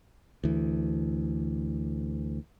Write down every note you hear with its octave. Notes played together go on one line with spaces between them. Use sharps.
D2 E3